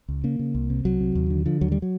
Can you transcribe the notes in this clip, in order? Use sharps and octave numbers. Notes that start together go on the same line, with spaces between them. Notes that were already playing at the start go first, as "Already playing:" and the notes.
C#2
C#3 A#3
C#3
C2
C3
C2 F#3
C3
D#2
D3
D3 F3
D#2 F#3
G3
F#3